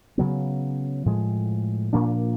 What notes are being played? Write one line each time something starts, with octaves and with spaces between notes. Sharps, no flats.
C#3 F#3 B3
A2 F3 G#3
A#2 F3 A#3 D4